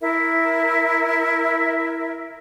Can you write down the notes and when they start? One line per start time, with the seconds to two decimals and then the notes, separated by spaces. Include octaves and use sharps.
0.01 E4 A#4 E5